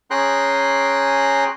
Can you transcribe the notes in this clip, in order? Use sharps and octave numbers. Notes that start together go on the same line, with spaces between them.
C#4 G#4 G5 A#5 C6 F#6